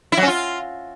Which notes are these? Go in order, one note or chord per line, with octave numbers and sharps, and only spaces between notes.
E4
F#3
C#4
F4